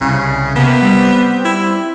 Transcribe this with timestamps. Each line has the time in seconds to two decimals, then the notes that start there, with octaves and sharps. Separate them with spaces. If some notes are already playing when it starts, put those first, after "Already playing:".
0.01 C2 C#3
0.56 C3 A#3 B3
0.82 G3 C4
1.45 E4